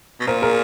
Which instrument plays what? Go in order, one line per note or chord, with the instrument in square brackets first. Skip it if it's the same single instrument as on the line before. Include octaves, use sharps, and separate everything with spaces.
[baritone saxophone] B2
[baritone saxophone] A#2 [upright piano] A#4 C5
[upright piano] G#4 A#4